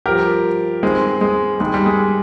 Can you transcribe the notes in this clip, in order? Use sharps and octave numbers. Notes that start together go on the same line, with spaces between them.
G2 F3 G4 A#4
G2 D#3 G#3 C4
G#3
G2 D#3 G#3
G3
G#3